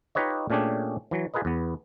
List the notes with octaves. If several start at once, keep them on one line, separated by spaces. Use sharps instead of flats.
D#4 F4 G4 B4 C#5 D#5
A#2 A3 C#4 D4 G4 G#4
E3 F#3
F4 G#4 A#4 B4 D#5
E2 B3